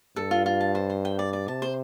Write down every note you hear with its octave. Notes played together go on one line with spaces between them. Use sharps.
G2 A4
F4
F4
A5
C5
C5
G5
D5
D5
C3 A5
C5